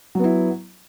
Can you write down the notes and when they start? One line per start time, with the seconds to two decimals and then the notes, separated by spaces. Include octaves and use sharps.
0.15 F#3
0.20 B3
0.24 E4